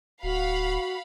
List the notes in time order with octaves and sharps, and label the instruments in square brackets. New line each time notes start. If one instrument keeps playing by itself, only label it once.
[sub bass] D1 [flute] F#4 [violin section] F5 F#5 B5